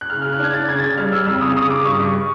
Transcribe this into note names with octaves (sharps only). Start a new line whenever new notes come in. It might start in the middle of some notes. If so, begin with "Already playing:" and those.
F#6
C#3 F6
C#3 F6
F#6
D4 G#6
D4 A6
C#3 G#6
A6
C#3 G#6
G3 F6
G3 E6
F2 E6
C#3 D#6
C#3 D#6
C#3 D6
G2 C#6
G2